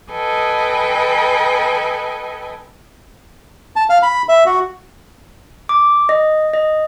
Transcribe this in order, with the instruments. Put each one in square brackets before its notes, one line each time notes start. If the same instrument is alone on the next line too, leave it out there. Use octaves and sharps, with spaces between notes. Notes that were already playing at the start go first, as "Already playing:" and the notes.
[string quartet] A4 B4 D#5 G5 G#5
[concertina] A5
F5
B5
E5
F#4
[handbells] D6
D#5
D#5